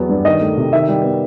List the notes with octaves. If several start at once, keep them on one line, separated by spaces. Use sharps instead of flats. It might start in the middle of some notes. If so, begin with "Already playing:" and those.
Already playing: E2 F#3 B3
G2
D#3 D#5
A3
C3
D#3 E5
G3
B3